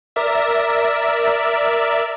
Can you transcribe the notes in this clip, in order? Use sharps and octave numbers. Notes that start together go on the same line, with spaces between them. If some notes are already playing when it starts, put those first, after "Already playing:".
A#4 D5 E5